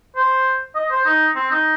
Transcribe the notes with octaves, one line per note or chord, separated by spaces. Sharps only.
C5
D#5
C5
D#4
C4
D#4